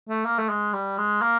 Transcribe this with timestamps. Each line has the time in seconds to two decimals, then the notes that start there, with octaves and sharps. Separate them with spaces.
0.09 A3
0.25 A#3
0.38 A3
0.49 G#3
0.73 G3
0.98 G#3
1.22 A#3